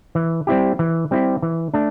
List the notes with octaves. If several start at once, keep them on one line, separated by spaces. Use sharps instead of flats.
E3
G3 C4 E4 G4
E3
G3 C4 E4 G4
E3
A3 D4